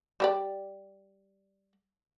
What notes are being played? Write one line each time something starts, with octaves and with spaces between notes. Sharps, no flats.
G3 G4 D5